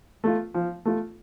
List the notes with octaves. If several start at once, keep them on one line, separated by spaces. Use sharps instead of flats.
A3 F4
F3
A3 F4